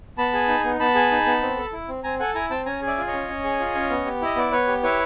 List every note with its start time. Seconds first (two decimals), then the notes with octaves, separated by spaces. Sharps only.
0.18 B3 A5 B5
0.33 G#4
0.48 D#4
0.64 B3
0.80 B3 A5 B5
0.95 G#4
1.11 D#4
1.26 B3
1.42 C4
1.57 A4
1.73 E4
1.89 C4
2.04 C4 G#5 A#5
2.20 A4 F#5 G#5
2.35 E4 G#5 A#5
2.50 C4 G5 A5
2.66 C#4 G#5 A#5
2.81 G#4
2.87 D5 E5
2.98 F4
3.07 C#5 D#5
3.13 C#4
3.28 C#4
3.44 G#4
3.60 F4
3.75 C#4
3.90 B3
4.06 G4
4.22 E4 D#5
4.36 B3 D5
4.52 B3 B4 C#5
4.68 G4
4.83 E4 B4 C#5